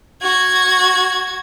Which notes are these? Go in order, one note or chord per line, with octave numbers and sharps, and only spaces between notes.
F#4 G#6